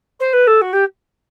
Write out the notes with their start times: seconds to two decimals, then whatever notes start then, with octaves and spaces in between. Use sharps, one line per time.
0.20 C5
0.33 B4
0.47 A4
0.61 F#4
0.73 G4